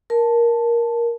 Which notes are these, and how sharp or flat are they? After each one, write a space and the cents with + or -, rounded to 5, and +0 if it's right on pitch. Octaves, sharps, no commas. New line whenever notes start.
A#4 +10 A5 +0